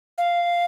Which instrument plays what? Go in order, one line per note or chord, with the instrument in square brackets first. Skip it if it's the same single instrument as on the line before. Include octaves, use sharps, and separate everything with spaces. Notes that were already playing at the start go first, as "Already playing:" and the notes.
[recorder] F5